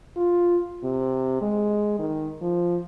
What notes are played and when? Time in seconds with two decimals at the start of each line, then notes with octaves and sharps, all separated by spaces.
0.16 F4
0.84 C3
1.41 G#3
1.99 D#3
2.41 F3